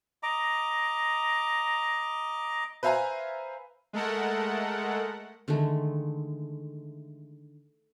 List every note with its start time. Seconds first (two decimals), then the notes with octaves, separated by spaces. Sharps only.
0.23 D#5 A#5 D6
2.83 B4 C5 E5 F5 G#5 A#5
3.93 G#3 A3 A4 A#4 F#5
5.48 D3 D#3 G#3 A3